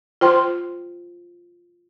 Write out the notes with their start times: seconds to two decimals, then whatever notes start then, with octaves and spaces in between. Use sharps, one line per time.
0.21 F4 C5 G5 C6